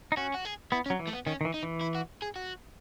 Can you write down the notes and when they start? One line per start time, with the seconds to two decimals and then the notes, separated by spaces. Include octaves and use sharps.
0.12 D#4
0.17 C#4 F#4
0.34 F#4
0.45 G#4
0.72 B3 E4
0.86 C#4
0.90 F#3
0.99 E3
1.07 A3
1.13 B3
1.27 D#3 C#4
1.41 D#3
1.45 E3
1.54 D#4
1.63 E3
1.81 E4
1.95 F#4
2.22 G#4
2.36 F#4